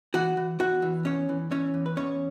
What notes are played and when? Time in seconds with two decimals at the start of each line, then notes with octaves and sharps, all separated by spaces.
0.14 E3 F#4 F#5
0.37 E3
0.59 E2 F#4 F#5
0.82 E3
1.05 E2 C#4 C#5
1.29 E3
1.51 E3 C#4 C#5
1.74 E2
1.86 B4
1.97 E2 C#4 C#5